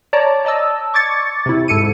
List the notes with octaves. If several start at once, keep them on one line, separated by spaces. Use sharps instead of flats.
C#5 D5 A5 A#5
D5 D#5 A5 E6
C#6 D6 G#6 A6 C#7
C3 E4
G#2 A4 C#7 D#7